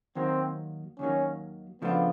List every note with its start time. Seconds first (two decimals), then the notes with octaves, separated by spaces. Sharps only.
0.16 D#2 D#3 F#3 A#3 C4
0.99 D#2 D#3 F#3 A#3 C#4
1.82 C#3 F3 A3 B3 D4 F4